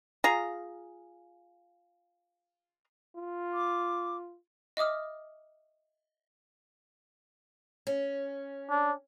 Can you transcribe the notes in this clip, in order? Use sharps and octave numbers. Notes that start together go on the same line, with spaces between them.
F4 G#4 A#5
F4
D6
D#5 E5 D6 D#6 F6
C#4
D4